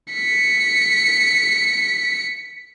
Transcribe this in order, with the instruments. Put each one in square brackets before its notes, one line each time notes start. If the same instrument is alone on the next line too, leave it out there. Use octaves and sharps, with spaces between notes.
[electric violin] B6 C#7